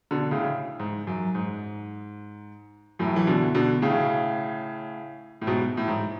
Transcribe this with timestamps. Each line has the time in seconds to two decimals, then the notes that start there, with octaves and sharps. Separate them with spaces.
0.11 B2 D3
0.31 A2 C#3
0.80 G#2
1.07 F#2
1.35 G#2
2.99 F#2 A2
3.16 E3
3.27 B2 D3
3.55 B2 D3
3.82 A2 C#3
5.42 A2
5.47 G#2 B2
5.77 A2
5.88 G#2